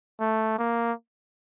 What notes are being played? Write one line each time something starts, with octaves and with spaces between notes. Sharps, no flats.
A3
A#3